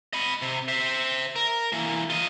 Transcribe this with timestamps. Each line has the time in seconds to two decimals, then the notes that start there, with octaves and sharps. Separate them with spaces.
0.13 D#5 B5
0.42 C3
0.68 C5 E5
1.36 A#4
1.73 E3 A#3
2.10 F4 D#5